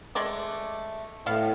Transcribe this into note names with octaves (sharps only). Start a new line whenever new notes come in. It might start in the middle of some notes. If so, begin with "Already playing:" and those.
G#3 A3 D5
A2 B3 F5